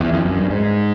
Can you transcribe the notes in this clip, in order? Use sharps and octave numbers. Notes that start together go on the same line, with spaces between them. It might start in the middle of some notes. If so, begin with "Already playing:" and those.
E2
F2
F#2
G2
G#2